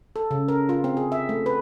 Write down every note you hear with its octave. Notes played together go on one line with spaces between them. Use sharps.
A4
C#3
A#4
F4
C4
G#4
E5
A3
B4